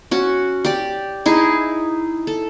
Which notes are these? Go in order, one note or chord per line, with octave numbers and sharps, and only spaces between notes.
C#4 F#4
G4 D5
D#4 E4 G#4
A4